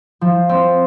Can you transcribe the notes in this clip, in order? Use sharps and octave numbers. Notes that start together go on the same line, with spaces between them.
F3
C4